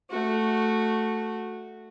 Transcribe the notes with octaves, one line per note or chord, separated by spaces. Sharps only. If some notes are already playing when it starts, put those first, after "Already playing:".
A3 F#4